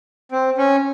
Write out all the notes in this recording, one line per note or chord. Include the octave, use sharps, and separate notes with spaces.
C4
C#4